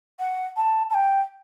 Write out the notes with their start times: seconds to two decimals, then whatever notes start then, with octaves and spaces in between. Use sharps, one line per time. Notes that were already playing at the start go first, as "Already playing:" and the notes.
0.19 F#5
0.56 A5
0.90 A5
0.94 G5